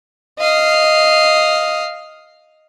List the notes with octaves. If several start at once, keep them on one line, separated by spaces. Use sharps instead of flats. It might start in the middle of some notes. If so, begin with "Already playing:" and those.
D#5 F5